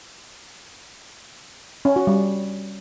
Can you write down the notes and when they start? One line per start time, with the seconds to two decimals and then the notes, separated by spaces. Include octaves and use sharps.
1.85 C#4
1.96 F#4
2.07 G3